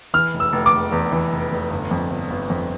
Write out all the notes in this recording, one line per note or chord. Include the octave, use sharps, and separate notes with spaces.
E3 F6
F1
E6
F1
D6
F1
E2
E3
F1
F1
G1
F2
G1
G1
F2